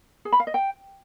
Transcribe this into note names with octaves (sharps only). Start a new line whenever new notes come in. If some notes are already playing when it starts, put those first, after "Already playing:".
G#4
B5
F5
D#5
G5